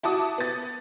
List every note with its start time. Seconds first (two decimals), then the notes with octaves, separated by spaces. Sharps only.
0.03 E4 F#4 A5 D6 D#6
0.38 B3 A6